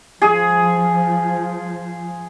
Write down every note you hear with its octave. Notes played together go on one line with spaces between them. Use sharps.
F3 G#4